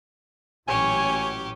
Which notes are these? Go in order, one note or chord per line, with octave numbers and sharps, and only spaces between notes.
A1 A#2 F#3 C#4 G4 C#5 G#5